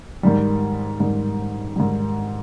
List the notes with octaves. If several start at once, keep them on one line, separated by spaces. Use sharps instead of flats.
G#2 D#3 G3
G#2 D#3 G3
G#2 D#3 G3